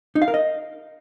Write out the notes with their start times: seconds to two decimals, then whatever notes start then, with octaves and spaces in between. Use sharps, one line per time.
0.15 D#4
0.22 F5
0.28 A#4
0.34 D#5